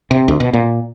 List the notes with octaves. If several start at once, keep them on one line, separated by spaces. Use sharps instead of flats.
C3
D2
B2
A#2